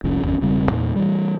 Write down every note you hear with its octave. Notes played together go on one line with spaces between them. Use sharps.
F1 C2 F3 C#4
G1 E2 C#4
E1 C#3 G3 C4
E2 A#2
E3 G3